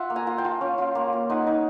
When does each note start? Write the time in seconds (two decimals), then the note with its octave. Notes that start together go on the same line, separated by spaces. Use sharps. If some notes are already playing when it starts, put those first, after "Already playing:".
Already playing: F4 E5 F#5
0.10 A#3
0.16 G#5 A#5
0.27 F4
0.38 G5 A5
0.45 F4
0.61 C#4
0.78 F4
0.95 A#3
1.13 A#3
1.29 D#4 F#5 G#5
1.47 D#4